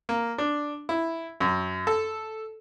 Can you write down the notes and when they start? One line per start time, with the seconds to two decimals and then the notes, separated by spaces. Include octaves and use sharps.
0.09 A#3
0.38 D4
0.89 E4
1.40 F#2
1.87 A4